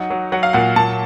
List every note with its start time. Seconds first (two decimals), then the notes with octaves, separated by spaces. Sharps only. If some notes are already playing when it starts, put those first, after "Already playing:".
Already playing: F#3 D#4 F#5
0.10 F#3
0.32 F#3 F#5
0.43 F5
0.53 A#2 F#5
0.76 A#2 A5